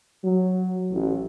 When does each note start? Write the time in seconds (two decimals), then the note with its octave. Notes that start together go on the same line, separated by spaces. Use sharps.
0.23 F#3
0.92 A1